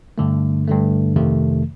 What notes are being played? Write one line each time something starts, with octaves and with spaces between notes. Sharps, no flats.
G2 D3 A3
G2 D3 A3
F2 C3 D#3 A3